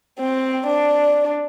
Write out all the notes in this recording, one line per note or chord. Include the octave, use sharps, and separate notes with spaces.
C4
D4